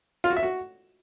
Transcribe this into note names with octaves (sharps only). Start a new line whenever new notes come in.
F4
F#4
E5
F#4